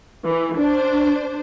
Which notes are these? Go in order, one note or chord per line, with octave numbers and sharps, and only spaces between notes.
E3
D4 C5